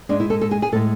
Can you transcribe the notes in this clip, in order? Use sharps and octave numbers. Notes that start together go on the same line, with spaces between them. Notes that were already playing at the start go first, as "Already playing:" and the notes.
G#2 G#3 D4
E4
A4
A4
G#4
G#4
A2 G#3 A4